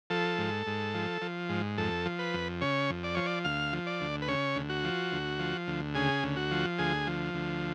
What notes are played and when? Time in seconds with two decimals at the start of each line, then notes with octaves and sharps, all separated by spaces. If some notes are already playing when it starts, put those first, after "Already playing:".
0.10 F3 A4
0.38 G#2
0.67 G#2
0.94 F3
1.22 F3
1.49 G#2
1.78 F2 A4
2.06 F3
2.19 B4
2.34 F2
2.61 C#3 C#5
2.90 F2
3.04 D5
3.15 F3 C#5
3.26 D5
3.45 D2 F5
3.73 F3
3.87 D5
4.01 D2
4.22 B4
4.28 C#3 C#5
4.56 D2
4.69 F#4
4.84 F3
5.12 D2
5.39 F3
5.67 D2
5.95 C#3 G#4
6.23 D2
6.36 F#4
6.51 F3
6.79 D2 G#4
7.07 F3
7.34 D2